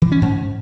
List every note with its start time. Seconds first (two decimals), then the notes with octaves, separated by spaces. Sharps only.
0.02 E3
0.12 C#4
0.22 G#2